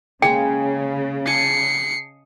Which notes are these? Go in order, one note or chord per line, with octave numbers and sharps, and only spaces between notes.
C#3 G#3 A#3 G#4 G5
D#5 G#5 A5 C7 C#7